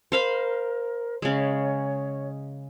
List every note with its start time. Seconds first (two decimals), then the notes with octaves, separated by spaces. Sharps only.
0.12 A#4 C5 F5 B5
1.22 C#3 G#3 C#5